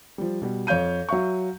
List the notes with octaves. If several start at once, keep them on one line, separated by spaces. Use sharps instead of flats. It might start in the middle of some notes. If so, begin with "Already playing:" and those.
F3 G3
B2 G3
F2 C#5 F5 G6 D#7
F#3 E5 F5 C#6